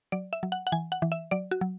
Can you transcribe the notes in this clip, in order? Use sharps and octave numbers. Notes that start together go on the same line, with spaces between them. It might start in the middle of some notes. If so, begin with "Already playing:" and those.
F#3 D5
E5
F#3
F#5
F#5
E3 G#5
F#5
E3
E5
F#3 D5
F#4
F#3